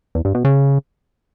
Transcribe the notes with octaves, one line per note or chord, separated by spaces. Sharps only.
E2
G2
B2
C#3